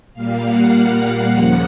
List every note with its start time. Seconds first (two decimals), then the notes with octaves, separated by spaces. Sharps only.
0.14 A#2 G3 A#3 F5
0.43 F#5
1.29 D#2 C#3 F3 A#3